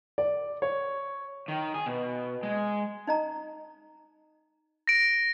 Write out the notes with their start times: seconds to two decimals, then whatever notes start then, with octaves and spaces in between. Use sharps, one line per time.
0.18 D5
0.62 C#5
1.48 D#3
1.74 G#4
1.86 B2
2.43 G#3
3.07 D#4 D#5 A#5
4.87 A#6 D7